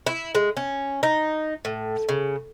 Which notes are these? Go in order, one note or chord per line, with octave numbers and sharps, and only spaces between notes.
E4
G#3
C#4
D#4
A2
C#3